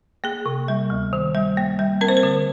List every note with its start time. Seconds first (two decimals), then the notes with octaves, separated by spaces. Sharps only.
0.24 A#3 G#4
0.46 C3
0.68 G3
0.90 D2
1.13 D#3
1.35 G3
1.57 A#3
1.79 G3
2.01 C4 A#4
2.09 C5
2.17 A#4
2.23 D3